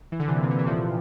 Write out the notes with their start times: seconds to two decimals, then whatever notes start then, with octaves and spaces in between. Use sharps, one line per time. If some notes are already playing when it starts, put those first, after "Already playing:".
0.12 E3
0.19 D3
0.28 C3 E3
0.35 A#2
0.43 C3
0.51 D3
0.59 E3
0.66 D3 F3